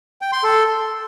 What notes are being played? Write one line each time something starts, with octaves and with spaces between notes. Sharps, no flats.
G5
C6
A4